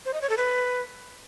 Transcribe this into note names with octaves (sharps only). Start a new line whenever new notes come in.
C5
D#5
C#5
A4
B4